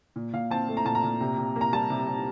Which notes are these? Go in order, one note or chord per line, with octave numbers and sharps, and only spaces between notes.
A#2
A#2 F5
C4 A5
A3
A#5
A#2 A5
A#5
A#2
C3
C3
A#3
A#5
G3 A5
C3
C3